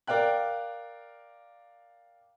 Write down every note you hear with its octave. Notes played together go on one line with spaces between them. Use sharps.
A#4 D5 F5 G5 F#6